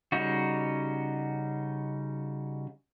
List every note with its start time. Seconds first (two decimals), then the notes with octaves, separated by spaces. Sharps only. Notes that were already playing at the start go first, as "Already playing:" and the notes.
0.12 C#3 G3 C#4 D#4 F#4